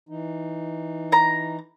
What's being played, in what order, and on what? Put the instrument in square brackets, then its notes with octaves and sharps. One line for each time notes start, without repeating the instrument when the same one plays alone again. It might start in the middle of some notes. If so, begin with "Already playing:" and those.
[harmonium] E3 D#4
[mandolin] A#5